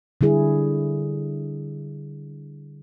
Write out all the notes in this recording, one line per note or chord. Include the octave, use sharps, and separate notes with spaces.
D3 G3 E4 G#4